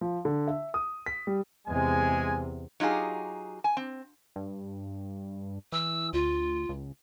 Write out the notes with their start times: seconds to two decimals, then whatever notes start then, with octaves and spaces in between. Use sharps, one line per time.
0.01 F3
0.25 D3
0.48 E5
0.74 D#6
1.06 B6
1.27 G3
1.67 E2 C3 G#3 G#5
2.80 F#3 D#4 F4 G4 G#4
3.64 G#5
3.77 C4
4.36 G2
5.72 E3 E6
6.13 D2 F4
6.69 C#2